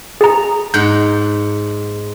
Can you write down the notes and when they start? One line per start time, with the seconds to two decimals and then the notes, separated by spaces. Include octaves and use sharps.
0.21 G#4 A#5
0.74 G#2 F#5 G6